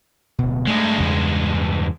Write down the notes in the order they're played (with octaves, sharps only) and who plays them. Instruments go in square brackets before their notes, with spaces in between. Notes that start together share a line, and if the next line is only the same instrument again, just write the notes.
[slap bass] D1 B2
[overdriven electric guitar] G2 G#3 [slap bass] A3
[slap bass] E2 C#3